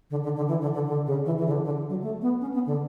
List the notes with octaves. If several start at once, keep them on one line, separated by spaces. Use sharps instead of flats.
D3
D3
D3
E3
D3
D3
D3
C#3
E3
E3
C#3
D3
D3
F#3
A3
B3
C#4
B3
D3